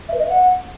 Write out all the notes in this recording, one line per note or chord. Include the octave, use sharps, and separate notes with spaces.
E5
B4
D#5
E5
F#5